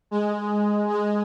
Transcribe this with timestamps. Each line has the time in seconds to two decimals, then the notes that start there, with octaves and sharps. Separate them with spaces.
0.11 G#3
0.90 G#3